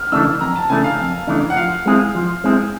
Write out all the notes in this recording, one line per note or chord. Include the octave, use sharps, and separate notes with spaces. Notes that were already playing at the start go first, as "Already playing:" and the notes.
Already playing: F6
C#3 E3 A3 D4 E6
F2 A#5
A5
C#3 E3 A3 D4 G#5
F5
F2
C#3 E3 A3 D4
F#5
F3 F5
G#3 C4 E4 G#4
F3
G#3 C4 E4 G#4